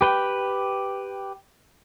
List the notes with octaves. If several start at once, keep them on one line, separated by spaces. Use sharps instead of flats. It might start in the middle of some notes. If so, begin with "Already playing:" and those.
G4 B4 G5